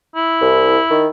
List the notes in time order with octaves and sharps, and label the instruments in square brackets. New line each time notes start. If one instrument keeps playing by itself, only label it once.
[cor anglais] E4
[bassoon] C2
D#3